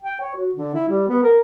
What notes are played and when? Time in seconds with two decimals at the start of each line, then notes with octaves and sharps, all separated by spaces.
0.03 G5
0.20 C#5
0.35 F#4
0.55 D3
0.74 E4
0.88 G3
1.08 B3
1.23 A#4